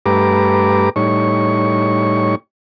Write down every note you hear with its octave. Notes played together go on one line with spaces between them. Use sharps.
G2 A3 G4 B4 A#5 D6
A2 G3 D#4 C#5 C#6